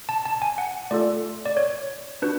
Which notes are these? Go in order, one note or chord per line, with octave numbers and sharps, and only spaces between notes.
A5
A5
G#5
F#5
A3 F4 A4 D5
D5
C#5
D4 F#4 B4